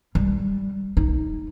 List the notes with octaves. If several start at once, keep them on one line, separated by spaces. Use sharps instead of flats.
G3
D#4